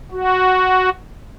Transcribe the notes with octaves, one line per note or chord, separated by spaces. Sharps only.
F#4